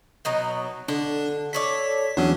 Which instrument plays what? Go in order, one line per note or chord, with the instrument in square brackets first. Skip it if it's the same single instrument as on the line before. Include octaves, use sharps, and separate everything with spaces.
[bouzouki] B2 F#3 D#4
[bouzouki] D3 [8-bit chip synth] D4
[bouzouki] A4 C#5 D5 [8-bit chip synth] B6
[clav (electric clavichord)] E2 F#3 [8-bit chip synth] C#4 D4